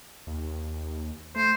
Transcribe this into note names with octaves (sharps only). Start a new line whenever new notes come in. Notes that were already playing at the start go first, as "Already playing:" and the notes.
D#2
A3 C5